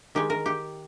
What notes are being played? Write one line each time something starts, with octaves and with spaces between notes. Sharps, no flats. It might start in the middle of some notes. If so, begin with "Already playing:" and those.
D#3 G#3 G4
A#4
G4